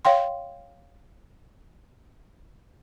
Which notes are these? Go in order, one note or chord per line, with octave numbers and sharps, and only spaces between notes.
C#5 F5 G5 C6